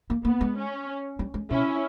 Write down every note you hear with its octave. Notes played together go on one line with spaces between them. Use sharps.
A#3
A#3 B3
G#3
C#4
G3
G#3
B2 C#4 E4